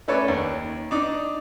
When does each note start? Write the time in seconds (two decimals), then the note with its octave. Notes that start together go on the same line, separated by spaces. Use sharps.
0.08 A3 C#4 A4 B4 C#5 D5
0.28 D#2
0.91 D4 D#4 D6